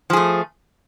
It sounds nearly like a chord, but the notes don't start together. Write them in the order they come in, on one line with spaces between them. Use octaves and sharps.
F3 G#4 A3